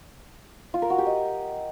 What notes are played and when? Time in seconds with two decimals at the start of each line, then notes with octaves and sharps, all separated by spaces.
0.74 F4
0.82 A#4
0.90 F#4
0.98 G4
1.06 D#5